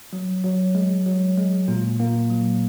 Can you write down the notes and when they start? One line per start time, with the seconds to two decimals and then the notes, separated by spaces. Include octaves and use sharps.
0.13 F#3
0.44 F#3
0.75 G#3
1.06 F#3
1.37 G#3
1.68 A#2 A#3
1.99 A#2 A#3
2.30 F#3